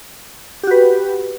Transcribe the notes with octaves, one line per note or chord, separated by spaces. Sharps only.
F#4 G4 B4